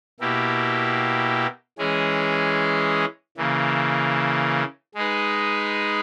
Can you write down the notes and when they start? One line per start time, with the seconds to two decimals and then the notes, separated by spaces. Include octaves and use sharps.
0.20 B2 A#3 E4 G4
1.78 E3 G#3 C#4 G#4
3.37 C#3 E3 A#3
4.95 G#3 D#4 G#4 B4